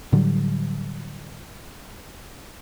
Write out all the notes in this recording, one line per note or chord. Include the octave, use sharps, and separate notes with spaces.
A2 D3 F#3 G3